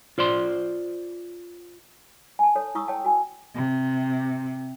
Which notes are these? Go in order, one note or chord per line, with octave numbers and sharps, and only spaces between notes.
F4 C5 D5 C6
G#5 A5
A4 C#5
E4 C#6 D#6 E6
C#5 G5 A5
F#4 G#5
C3